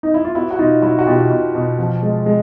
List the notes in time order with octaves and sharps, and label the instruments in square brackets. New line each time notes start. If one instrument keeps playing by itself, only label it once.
[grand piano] D#4
E4
F4
B3 E4 F#4
F#4
B2 D#4 F4
F#3 E4 F#4
F#4
B2 F4 G4
B2
B2
F3
G#3
G#3